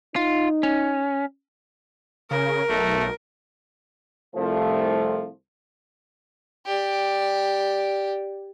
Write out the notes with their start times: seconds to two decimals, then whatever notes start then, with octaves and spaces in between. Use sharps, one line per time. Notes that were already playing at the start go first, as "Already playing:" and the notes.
0.16 D#4 F4
0.63 C#4
2.31 C#3 A#4
2.69 B1 A3
4.35 C2 C3 F3 A3
6.66 G4 D5